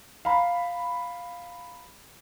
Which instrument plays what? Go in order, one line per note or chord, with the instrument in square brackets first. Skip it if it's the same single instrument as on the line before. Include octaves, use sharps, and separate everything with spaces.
[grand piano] F5 A#5 B5